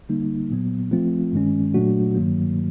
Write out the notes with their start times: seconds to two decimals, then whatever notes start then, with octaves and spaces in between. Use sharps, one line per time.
0.09 D3 G3 A#3 D#4
0.51 A#2 F#3 B3
0.91 F3 A3 C4 F4
1.32 G2 D#3 G#3 C#4
1.74 A#2 F#3 A3 D4 F#4
2.15 G2 D#3 F#3 A#3